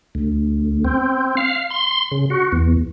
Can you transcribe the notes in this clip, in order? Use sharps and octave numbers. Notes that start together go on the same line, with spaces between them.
D2
C4
F5
C6
C#3
F#4
E2